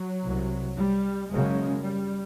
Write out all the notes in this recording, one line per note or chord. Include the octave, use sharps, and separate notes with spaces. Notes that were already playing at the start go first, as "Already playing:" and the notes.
Already playing: F#3
C2 C3
G3
F#1 F#2 C#3 G#3
G3